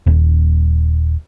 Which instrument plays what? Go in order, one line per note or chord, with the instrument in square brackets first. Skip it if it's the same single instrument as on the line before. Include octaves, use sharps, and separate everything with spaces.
[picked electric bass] D#1